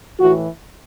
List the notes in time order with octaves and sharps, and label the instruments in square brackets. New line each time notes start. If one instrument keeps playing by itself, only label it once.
[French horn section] A2 E3 F#4